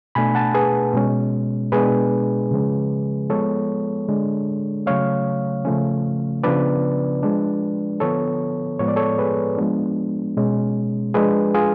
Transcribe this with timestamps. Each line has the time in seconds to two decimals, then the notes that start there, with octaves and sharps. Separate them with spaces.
0.15 B2 A3 D4 G#5 B5
0.35 F#5 A5
0.54 G#4 B4
0.94 B2 G#3 C#4
1.72 B2 G#3 B3 D4 G#4 B4
2.51 C#3 F3 G#3 C#4
3.29 F3 G#3 B3 A4 C#5
4.09 D3 G#3 D4
4.86 C#3 F#3 A3 C#4 C#5 F5
5.65 C#3 F3 A3 C#4
6.44 C#3 F3 B3 D4 B4 D5
7.23 F3 G#3 D4
8.00 D3 F3 B3 A4 C#5
8.79 A2 F3 G#3 B3 C#5
8.88 D5
8.96 A4 C#5
9.18 G#4 B4
9.57 F3 G#3 B3 D4
10.37 B2 G#3 C#4
11.14 F3 G#3 D4 G#4 B4
11.55 F4 G#4